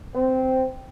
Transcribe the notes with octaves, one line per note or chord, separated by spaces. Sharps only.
C4